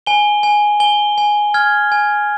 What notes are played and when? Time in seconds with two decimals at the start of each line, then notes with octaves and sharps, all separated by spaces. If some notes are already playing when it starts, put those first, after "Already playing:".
0.07 G#5 G7
0.43 G#5
0.80 G#5 G7
1.18 G#5
1.54 F6 G#6
1.92 G#5